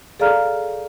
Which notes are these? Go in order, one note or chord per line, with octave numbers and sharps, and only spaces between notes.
G#4 A4 D5 F5 A#5 F6